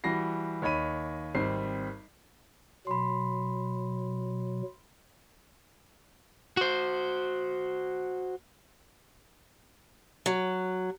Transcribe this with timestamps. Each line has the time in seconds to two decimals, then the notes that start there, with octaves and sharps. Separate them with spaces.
0.04 E3 G3 F#4 A#6 C7
0.62 D#2 C#5 D#5 B5 D#7
1.35 G#1 G3 C4 C7
2.87 B2 F#3 B5 C6
6.57 F#4 C5
10.26 F#3